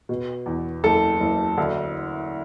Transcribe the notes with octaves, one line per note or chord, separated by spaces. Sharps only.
B2
E2
F#1 A4
F#1
D2